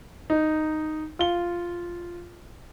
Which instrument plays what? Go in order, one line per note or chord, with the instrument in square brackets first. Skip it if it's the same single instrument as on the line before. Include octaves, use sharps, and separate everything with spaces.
[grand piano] D#4
F4 G7